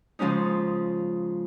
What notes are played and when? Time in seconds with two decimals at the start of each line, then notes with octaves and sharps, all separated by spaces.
0.19 C#3 F3 G#3 C#4 D#4